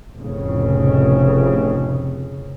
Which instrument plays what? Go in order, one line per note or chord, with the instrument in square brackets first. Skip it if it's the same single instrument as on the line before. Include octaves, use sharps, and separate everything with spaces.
[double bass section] F1 A2 C#3